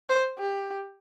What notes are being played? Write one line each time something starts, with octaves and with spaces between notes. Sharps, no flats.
C5
G4